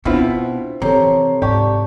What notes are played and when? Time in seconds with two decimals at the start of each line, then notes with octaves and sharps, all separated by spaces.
0.05 B2 B3 C4 D4 E4 F4
0.82 C3 E3 A4 C#5 A#5
1.42 G#2 F4 G4 D5 A5 C#6